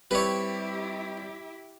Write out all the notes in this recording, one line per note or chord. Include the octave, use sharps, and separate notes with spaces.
G3 C4 E4 G4 B4 C#5